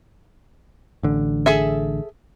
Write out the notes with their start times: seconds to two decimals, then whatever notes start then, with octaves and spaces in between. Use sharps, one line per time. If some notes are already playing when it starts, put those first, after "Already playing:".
1.03 A1 D3
1.46 G#4 A4 E5